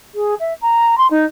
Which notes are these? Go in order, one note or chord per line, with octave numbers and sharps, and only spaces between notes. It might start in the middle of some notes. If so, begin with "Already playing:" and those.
G#4
E5
A#5
C6
D#4